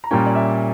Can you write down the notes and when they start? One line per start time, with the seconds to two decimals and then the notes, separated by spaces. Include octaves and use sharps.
0.04 A#5
0.11 A#2 G3 A#3 C#4 G5
0.26 D5
0.35 E5